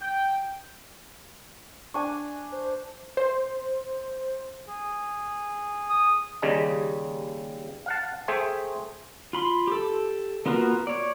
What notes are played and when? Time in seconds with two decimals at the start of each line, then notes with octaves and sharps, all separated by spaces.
0.01 G5
1.94 D4 G#5 C#6
2.52 C5
3.17 C5
4.68 G#4
5.90 D#6
6.42 D#2 C#3 G3 G#4 D#5
7.86 F5 F#5 A5
8.28 A3 G#4 C5 E5 G5
9.33 F4 B5 C6
9.67 G4 A4
10.46 A#3 B3 F4 F#4 A#4
10.87 C#5 D5